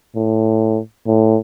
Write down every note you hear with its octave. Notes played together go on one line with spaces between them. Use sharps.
A2
A2